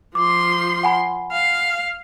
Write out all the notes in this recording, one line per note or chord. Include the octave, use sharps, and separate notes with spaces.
F3 C6 D6
F#5 G#5 B5
F5